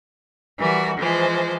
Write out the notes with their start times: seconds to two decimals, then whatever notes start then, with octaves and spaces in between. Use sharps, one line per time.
0.58 E3 G3 F#4 A#4
0.97 E3 F3 G#3 C5